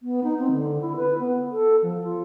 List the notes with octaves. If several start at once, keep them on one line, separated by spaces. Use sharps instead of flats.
B3
D#4
C4
D3
E4
B4
B3
A4
F3
F4